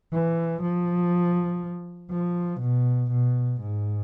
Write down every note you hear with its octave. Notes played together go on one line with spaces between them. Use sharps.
E3
F3
F3
B2
B2
G#2